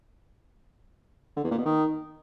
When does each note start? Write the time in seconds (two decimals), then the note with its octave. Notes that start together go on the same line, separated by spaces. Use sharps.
1.37 D3
1.44 E2
1.51 A#2
1.58 B2
1.65 D#3